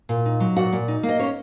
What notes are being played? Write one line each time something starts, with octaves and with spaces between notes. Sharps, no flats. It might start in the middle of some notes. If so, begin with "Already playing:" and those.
A#2
D#4
F#3
A#2 F#4 F#5
A#2
D#4
A#3
D#5
C#4 C#5